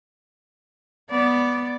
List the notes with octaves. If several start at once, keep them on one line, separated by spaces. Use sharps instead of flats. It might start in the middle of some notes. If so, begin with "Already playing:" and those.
B3 D5